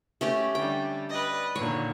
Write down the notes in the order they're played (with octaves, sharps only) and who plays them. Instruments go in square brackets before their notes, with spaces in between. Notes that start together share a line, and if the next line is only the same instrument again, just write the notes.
[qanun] A3 C#4 G4
[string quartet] D3 G3 [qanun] G5
[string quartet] B4 D5 D#5
[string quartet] A#2 D3 D#3 [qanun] C#5